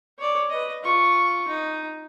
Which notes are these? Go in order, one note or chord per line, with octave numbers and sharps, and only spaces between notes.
C#5 D5
B4 D#5
F4 C#6
D#4